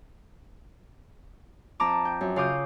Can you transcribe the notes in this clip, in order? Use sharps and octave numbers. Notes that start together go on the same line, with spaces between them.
F2 A5 A#5 D6
G5
F#2
C#3 F4 F5 D6 D#6 G6